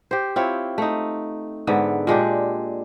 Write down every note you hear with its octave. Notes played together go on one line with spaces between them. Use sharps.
G4 C5
C4 E4 F4 C#5
A3 D#4
G#2 D3 B3 E5
A#2 G#3 D4 G4